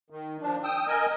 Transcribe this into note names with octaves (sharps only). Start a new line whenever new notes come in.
D#3
F3 D4
G5 D#6 E6
A#4 D#5 G#5